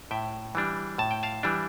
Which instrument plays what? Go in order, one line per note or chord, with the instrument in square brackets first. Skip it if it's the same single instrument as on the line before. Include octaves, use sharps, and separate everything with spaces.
[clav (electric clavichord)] A2 E5 G5
E3 G3 D4
A2 A5
G5
F5 A5
E3 G3 D4